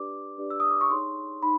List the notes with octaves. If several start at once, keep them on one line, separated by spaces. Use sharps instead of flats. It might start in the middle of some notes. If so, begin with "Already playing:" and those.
Already playing: D4 G4 B4 D5 D6
D4 G4 B4 D5
E6
D#6
D6
C#6
D#4 G#4 C#5 C6
D#4 B5